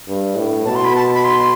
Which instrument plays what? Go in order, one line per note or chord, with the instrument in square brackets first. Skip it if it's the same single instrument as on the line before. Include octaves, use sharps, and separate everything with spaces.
[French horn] G2
A2
[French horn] B2 [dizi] A5
[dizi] C6
B5
A5
B5
C6